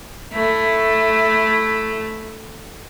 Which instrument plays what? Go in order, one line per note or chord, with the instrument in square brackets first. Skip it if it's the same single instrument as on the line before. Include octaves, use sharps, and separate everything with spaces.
[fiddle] A3 [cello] E4